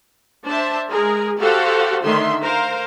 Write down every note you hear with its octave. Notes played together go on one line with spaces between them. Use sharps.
D4 C5 E5 A5
G#3 G#4 A#4
F#4 G4 A4 C5 F5 F#5
D3 D#3 A3 E5 C6
A#4 C5 F5